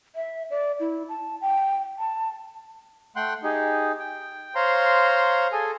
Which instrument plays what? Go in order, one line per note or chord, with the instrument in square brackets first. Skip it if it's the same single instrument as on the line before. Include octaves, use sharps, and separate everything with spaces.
[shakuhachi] E5
D5
E4
A5
G5
A5
[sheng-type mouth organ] A3 F#5 G5 C6 F#6
D#4 G4 G#4
G5
C5 C#5 F5 A#5 C6
G#4 A4 G#5